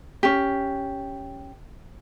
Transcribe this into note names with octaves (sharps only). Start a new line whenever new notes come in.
C#4 G4